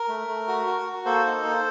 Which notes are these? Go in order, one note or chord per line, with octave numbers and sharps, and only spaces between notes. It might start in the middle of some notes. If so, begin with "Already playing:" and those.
Already playing: A#4
A3
A3
F#4
F#4
F#4
A#3 A4 C5
D#4
A#3